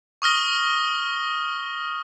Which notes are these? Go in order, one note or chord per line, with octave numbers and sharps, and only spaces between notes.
C#6 D#6 F6 A#6 G7